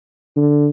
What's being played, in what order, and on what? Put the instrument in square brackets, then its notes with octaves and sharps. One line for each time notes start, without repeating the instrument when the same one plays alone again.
[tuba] D3